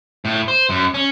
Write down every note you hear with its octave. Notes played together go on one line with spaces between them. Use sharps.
A2
C5
F#2
C#4